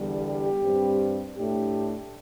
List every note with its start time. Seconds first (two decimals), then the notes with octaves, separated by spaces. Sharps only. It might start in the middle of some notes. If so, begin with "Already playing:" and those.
Already playing: E2 D3 G3
0.26 G4
0.62 G2 G3 C4
1.36 A2 A3 D4 G4